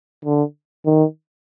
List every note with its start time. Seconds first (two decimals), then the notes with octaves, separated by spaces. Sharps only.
0.25 D3
0.86 D#3